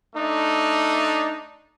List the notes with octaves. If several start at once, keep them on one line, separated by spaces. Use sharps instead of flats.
A3 D4 D#4